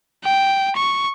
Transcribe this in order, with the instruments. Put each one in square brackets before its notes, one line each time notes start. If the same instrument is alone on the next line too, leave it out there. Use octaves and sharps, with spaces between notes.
[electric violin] G5
C#6